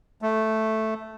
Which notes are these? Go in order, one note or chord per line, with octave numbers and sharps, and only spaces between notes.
A3